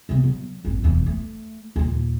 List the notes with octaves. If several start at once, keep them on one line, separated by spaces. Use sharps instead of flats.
C3 B3
F#3
G#1 F#2
E1 E3
A3
D#2 A#2